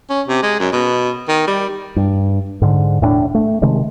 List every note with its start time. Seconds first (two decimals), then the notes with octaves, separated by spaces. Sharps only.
0.10 C#4
0.28 C3
0.42 G#3
0.60 F#2
0.73 B2
1.28 D#3
1.47 G3
1.96 G2
2.62 G#2 D3
3.01 E1 A2 A#3 D4
3.34 A3
3.62 C3 D#3 G#3 A3